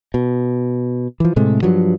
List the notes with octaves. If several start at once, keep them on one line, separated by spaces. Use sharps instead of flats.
B2
E3 F3
A2 C3 G#3 A3
G2 F3 F#3